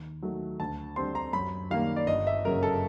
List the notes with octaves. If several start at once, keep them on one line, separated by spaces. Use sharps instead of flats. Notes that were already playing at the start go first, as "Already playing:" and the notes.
Already playing: D#2
D#3 F#3 A3
D2 A5
D3 G3 C4 C6
A#5
F#2 B5
D#3 G3 A#3 F5
D5
G1 D#5
E5
F#2 C#3 F#3 A#4
A4